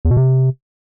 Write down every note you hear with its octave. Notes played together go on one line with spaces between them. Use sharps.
E2
B2
C3